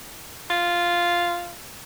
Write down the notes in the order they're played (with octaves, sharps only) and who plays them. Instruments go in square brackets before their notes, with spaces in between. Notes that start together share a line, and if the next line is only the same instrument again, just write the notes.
[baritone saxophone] F4